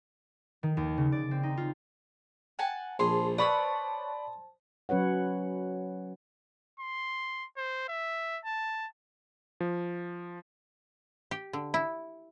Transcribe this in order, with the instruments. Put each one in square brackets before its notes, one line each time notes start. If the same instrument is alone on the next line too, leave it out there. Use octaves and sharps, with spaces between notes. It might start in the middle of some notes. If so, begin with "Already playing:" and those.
[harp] D#3
D#2
C#3
D5
C4
D#4
F4
[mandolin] F#5 G#5 A5
[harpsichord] A#1 G#4 [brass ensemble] C5 A5 [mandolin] C6
[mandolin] B4 C#5 E6 [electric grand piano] D5 B5 [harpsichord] D#6
[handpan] F#3 C#4 B4 C#5 F#5
[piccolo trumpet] C6
C5
E5
A5
[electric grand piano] F3
[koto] G4
D3
E4